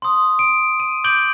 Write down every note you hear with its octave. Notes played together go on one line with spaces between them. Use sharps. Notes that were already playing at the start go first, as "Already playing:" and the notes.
C6 D#6
D7
D#7
D6 G6 D7 F#7 G7